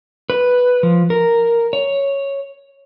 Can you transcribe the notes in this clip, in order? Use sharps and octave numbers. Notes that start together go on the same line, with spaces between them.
B4
F3
A#4
C#5